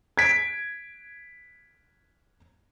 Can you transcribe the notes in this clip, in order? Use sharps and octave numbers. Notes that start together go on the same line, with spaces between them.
G#6 B6 D7